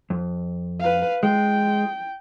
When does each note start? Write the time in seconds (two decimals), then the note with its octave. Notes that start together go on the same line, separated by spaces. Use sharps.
0.10 F2
0.79 B4 F5
1.23 G#3 G5